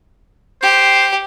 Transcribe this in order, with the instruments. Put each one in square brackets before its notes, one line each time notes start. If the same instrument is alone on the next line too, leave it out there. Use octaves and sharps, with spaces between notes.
[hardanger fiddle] G4 [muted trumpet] C5